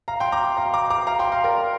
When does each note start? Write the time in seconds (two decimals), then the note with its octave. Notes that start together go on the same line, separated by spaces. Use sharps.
0.08 F5 A#5
0.20 G5 C6
0.32 A#5 D6
0.57 F5 A#5
0.74 A#5 D6
0.90 A#5 D6
1.07 F5 A#5
1.19 G5 C6
1.32 F5 A#5
1.44 A#4 D5